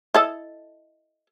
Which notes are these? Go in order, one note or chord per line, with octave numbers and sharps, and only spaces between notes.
E4 A4 D#5